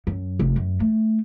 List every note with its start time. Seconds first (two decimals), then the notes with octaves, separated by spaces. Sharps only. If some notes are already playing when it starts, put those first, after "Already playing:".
0.07 F#2
0.39 F1
0.56 F#2
0.80 A3